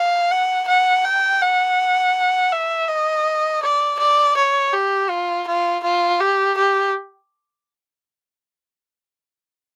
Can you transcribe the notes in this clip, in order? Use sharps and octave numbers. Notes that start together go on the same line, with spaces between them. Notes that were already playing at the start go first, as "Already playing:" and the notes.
Already playing: F5
F#5
F#5
G5
F#5
E5
D#5
D5
D5
C#5
G4
F4
F4
F4
G4
G4